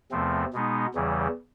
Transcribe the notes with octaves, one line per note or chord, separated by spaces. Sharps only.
E2 C3 F3 A3 C4
B2 G#3 B3 D#4
E2 C#3 E3 G3